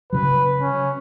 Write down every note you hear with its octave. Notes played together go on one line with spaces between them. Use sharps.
C#3 F#3 B4
C#4